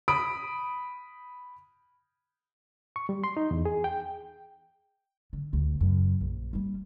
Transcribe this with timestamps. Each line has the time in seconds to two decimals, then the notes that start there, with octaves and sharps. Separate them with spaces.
0.08 B5 D#6 D7
2.96 C#6
3.09 G3
3.24 C6
3.37 D#4
3.51 E2
3.65 G#4
3.84 G5
5.33 D3
5.53 D2
5.81 F#2 C#3
6.21 A#1
6.53 G3 A#3